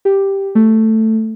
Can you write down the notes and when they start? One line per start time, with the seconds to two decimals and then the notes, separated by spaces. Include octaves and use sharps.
0.05 G4
0.55 A3